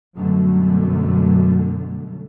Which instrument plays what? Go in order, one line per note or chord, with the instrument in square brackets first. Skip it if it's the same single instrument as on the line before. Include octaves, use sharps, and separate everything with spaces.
[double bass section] F#2 B2 D3 F#3 G3 A3